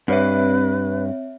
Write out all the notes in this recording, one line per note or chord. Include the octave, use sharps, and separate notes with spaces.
G2 C4 B4 C#5 E5